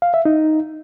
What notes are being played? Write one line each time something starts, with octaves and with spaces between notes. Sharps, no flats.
F5
E5
D#4